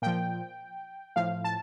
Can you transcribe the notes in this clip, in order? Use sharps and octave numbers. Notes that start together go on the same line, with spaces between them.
A#2 F3 G5
A2 F3 F5
A5